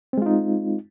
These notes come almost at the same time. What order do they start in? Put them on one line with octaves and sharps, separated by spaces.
C4 G#3 F4 D#4